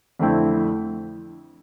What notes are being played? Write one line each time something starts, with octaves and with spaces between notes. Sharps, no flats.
F2 D3 A3 C4 E4